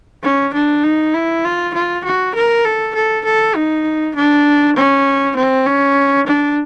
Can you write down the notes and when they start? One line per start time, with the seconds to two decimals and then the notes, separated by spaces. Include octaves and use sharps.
0.23 C#4
0.54 D4
0.84 D#4
1.14 E4
1.44 F4
1.74 F4
2.05 F#4
2.35 A#4
2.65 A4
2.95 A4
3.25 A4
3.56 D#4
4.16 D4
4.76 C#4
5.36 C4
5.67 C#4
6.27 D4